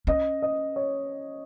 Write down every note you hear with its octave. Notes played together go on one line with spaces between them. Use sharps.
C#4 D#5
D#5
C#5